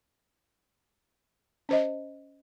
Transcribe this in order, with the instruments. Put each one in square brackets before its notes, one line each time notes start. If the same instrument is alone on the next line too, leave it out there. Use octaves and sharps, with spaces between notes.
[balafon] C#4 C5 D#5